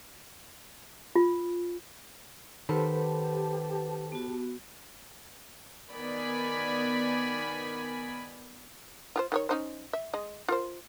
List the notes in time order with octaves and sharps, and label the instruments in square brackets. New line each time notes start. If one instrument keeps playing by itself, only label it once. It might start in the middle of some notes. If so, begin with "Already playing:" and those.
[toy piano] F4
[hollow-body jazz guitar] D#3 [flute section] G4 A5 [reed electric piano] A4 C5 B5 [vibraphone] B4 F#5
[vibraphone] B3 F#4
[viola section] D#3 B3 D5 G#5 B5
[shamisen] F4 G#4 C5
D#3 G#4 C#5
C#4 D#4 C5
E5
G#3 D#5
F4 A#4 C5